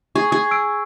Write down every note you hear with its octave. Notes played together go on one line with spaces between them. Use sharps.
G#4 C#6
G#4
E6 D7